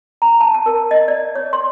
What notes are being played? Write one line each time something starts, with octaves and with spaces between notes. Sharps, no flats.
A#5
A5
A5
A#4
D#5
D5
C#5
C6